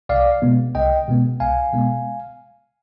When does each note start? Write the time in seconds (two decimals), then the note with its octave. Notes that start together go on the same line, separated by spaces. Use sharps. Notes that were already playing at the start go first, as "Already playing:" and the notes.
0.09 C2 D5 F5
0.42 B2 G#3 B3
0.75 C2 D#5 G5
1.08 B2 G#3 B3
1.40 C2 F5 G#5
1.73 B2 G#3 B3